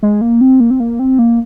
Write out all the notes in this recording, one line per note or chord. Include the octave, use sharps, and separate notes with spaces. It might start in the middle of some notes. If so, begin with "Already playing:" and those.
G#3
A#3
C4
A#3
C4
A#3
C4
A#3